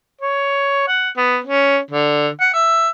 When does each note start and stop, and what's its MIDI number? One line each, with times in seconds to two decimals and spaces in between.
0.21 0.85 73
0.88 1.10 78
1.17 1.38 59
1.44 1.78 61
1.91 2.29 50
2.40 2.52 78
2.53 2.89 76